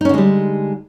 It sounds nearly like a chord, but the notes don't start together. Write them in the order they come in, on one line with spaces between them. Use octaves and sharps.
D#4 C#4 D3 G#3 G3